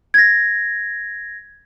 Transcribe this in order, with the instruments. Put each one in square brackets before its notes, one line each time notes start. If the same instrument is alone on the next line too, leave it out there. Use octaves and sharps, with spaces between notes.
[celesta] G#6 A#6